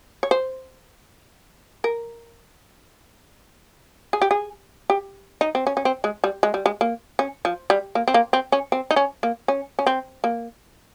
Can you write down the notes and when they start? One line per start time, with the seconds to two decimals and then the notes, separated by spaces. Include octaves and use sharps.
0.23 C#5
0.31 C5
1.84 A#4
4.13 G#4
4.22 G4
4.31 G#4
4.90 G4
5.41 D#4
5.55 C4
5.67 C#4
5.77 C#4
5.85 C4
6.04 G#3
6.24 G3
6.43 G#3
6.54 G3
6.66 G#3
6.81 A#3
7.19 C#4
7.45 F3
7.70 G3
7.95 A#3
8.08 C4
8.14 A#3
8.33 C4
8.52 C#4
8.72 C4
8.91 D#4
8.96 C#4
9.23 A#3
9.48 C#4
9.79 C#4
9.87 C4
10.24 A#3